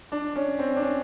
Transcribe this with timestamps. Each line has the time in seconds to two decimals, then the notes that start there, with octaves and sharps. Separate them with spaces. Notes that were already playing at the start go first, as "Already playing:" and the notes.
0.12 D4
0.36 C#4
0.59 C4
0.76 D4
0.82 C#4